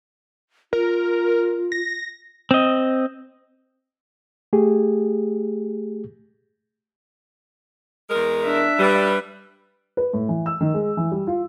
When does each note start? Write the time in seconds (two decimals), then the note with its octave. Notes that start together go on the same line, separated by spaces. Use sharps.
0.73 F4 A#4
1.72 A#6
2.51 C4 D#5
4.53 A3 G4 G#4
8.10 E2 G#3 A#4
8.44 D4 E5
8.79 G3 B4
9.97 B4
10.13 A2
10.29 E3
10.46 E6
10.61 D#3
10.74 G#3
10.97 E3
11.11 G3
11.27 F4